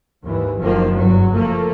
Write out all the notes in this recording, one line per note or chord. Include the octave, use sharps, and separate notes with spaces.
D#2 G#2 E3
F#1 D#3 F3 A#3
F#1 E2 G2 F#3
F3 A3 A#3